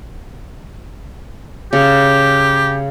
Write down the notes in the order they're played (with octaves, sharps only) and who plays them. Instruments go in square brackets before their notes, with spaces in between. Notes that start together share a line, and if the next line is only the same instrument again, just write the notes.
[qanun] C#3 [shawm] G4